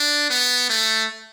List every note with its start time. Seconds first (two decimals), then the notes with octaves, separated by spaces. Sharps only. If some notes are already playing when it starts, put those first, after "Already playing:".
Already playing: D4
0.30 B3
0.70 A3